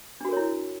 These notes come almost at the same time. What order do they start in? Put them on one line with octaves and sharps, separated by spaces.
D4 F#4 A#4 C#5 E4